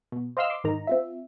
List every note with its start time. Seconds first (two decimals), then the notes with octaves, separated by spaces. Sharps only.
0.12 B2
0.37 C5 D#5 F5 C6 E6 F6
0.50 C6 D6
0.64 G#2 D#3 D#4 A#5
0.87 C4 F4 E5